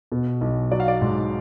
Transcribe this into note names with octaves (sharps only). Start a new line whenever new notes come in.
B2
B1
F#3 D5
F5
D5
G#2